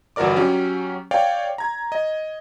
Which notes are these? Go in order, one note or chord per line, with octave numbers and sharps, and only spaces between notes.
G1 E3 F#4 A#4 D5 D6
F#3 C#4 G4
C#5 D5 F5 G5
A#5 G#6
D#5